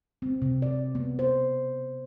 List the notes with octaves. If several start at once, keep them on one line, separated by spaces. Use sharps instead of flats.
C4
C3
D5
B3
C5